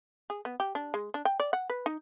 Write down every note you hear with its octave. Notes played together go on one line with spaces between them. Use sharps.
G#4
B3
G4
D4
G#3
D4
G5
D5
F#5
B4
D#4